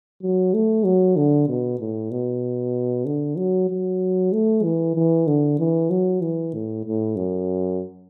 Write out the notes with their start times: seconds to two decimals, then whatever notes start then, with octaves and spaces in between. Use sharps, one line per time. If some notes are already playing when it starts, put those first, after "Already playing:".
0.22 F#3
0.54 A3
0.84 F#3
1.16 D3
1.48 B2
1.80 A2
2.11 B2
3.06 D3
3.37 F#3
3.70 F#3
4.33 A3
4.64 E3
4.95 E3
5.27 D3
5.59 E3
5.90 F#3
6.21 E3
6.54 A2
6.85 A2
7.16 F#2